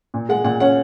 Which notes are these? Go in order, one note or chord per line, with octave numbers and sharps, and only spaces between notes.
A#2
G#3 F#5
A#2 F#5
C#4 F#5